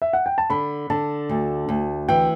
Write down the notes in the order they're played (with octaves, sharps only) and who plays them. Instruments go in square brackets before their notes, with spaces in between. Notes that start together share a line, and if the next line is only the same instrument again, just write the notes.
[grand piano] E5
F#5
G5
A5
[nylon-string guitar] D3 [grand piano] B5
[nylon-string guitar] D3 [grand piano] A5
[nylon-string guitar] D2
D2
[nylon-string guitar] E3 [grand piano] G5